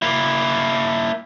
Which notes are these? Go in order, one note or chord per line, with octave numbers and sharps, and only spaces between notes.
A#3 E4